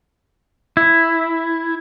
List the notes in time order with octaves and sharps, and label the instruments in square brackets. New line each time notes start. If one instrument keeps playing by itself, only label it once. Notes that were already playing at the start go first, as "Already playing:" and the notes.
[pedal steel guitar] E4